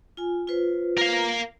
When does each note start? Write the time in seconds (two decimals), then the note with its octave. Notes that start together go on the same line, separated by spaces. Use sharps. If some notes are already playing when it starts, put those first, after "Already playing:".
0.17 F4 G#5
0.48 F4 B4 C5
0.98 A#4 F5